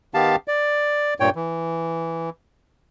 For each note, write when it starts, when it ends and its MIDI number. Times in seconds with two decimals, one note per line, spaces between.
0.14 0.36 51
0.14 0.36 59
0.14 0.36 67
0.14 0.36 77
0.14 0.36 81
0.48 1.14 74
1.20 1.30 43
1.20 1.30 46
1.20 1.30 73
1.20 1.30 79
1.36 2.30 52